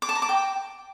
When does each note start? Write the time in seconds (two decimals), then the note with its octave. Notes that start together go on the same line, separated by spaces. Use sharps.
0.02 D6
0.09 A5
0.15 A#5
0.22 D6
0.29 G5